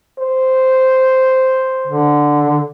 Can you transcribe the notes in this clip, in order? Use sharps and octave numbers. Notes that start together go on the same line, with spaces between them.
C5
D3